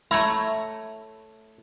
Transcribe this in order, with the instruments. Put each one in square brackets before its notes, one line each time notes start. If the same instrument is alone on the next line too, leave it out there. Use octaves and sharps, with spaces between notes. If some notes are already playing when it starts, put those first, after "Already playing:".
[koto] A3 C#5 A#5 [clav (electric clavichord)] E4